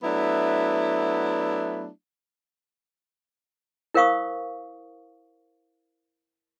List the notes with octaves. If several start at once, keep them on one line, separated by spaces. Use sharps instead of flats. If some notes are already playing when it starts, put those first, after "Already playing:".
F#3 A3 B3 D4 E4
E4 A#4 C5 F5 C#6 D#6